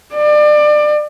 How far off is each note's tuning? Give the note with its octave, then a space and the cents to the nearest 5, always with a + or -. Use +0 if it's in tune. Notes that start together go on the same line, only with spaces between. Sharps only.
D5 +30